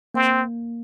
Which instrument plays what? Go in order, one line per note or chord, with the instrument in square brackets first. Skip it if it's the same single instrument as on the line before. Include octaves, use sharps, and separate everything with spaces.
[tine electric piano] A#3 [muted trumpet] C4